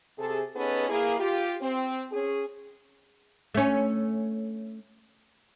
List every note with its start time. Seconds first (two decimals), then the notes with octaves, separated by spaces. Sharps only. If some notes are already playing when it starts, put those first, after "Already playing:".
0.18 C3 G#4 A4
0.55 B3 C#4 D#4 G#4 A4 B4
0.89 A#3 E4 G#4
1.20 F4 G4
1.61 C4
2.12 C#4 G#4
3.54 A3 C#4